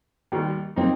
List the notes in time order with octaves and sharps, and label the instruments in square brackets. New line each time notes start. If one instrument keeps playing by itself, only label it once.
[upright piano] D#2 D#3 G3
[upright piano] A#2 A#3 D#4 [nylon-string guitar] C4